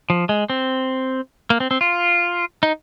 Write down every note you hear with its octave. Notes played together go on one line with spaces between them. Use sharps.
F3
G#3
C4
A#3
C4
C4
F4
D#4